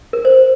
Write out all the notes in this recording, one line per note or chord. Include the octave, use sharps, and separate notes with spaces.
A#4
C5